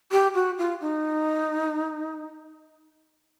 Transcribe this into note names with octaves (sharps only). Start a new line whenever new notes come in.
G4
F#4
F4
D#4